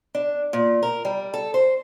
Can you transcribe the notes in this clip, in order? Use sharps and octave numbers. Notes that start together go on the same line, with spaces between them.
D4
A#2
A#4
G3
A4
C5